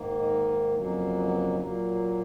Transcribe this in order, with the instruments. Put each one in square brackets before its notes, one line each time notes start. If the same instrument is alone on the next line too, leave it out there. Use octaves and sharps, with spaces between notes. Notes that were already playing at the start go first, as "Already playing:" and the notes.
Already playing: [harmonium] G#2 D#3 A#3
D#4
F2 C#3 F#3 A#3
D#4
B3
C#4
D#4
A#2 F#3 A#3